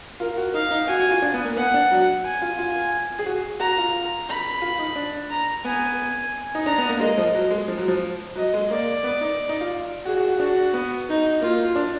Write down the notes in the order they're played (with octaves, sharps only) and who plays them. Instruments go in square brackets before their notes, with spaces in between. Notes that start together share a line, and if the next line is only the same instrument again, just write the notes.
[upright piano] F4 [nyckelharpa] A#4
[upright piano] F#4
[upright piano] D#4 [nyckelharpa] F5
[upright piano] D#4
[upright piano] F#4 [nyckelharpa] G#5
[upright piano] F#4
F4
D4
B3
A#3
[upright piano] B3 [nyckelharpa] F#5
[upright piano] D4
F#3
[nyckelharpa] G#5
[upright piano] F4
F4
G#4
F#4
[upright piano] F#4 [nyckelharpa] A#5
[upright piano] F4
[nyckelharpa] B5
[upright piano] F4
D#4
D4
[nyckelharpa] A#5
[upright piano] B3 [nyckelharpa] G#5
[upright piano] D#4
[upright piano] D4 [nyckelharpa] A#5
[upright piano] B3
A#3
[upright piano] G#3 [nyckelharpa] D#5
[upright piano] F3
F#3
G#3
F3
F#3
F3
[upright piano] F#3 [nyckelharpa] D#5
[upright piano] G#3
[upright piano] A#3 [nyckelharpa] D5
[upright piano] B3
D#4
D#4
F4
[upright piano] F#4 [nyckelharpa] G#4
[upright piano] F#4
F#4
[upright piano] D4 [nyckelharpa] F#4
[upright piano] B3
[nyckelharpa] D#4
[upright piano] A#3 [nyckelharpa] F4
[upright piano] D4